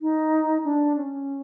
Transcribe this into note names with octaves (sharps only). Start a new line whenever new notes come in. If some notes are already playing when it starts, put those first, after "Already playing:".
D#4
D4
C#4